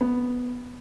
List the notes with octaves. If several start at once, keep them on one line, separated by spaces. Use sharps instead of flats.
B3